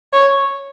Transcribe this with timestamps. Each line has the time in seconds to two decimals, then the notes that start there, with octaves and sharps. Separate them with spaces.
0.13 C#5